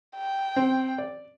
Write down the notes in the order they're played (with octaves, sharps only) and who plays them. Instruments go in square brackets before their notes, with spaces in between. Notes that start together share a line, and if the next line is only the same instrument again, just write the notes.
[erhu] G5
[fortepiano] C4
D5